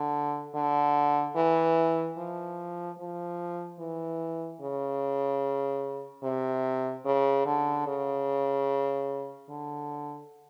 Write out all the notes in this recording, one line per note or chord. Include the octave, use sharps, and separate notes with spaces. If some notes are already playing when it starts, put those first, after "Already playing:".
Already playing: D3
D3
E3
F3
F3
E3
C#3
C3
C#3
D3
C#3
D3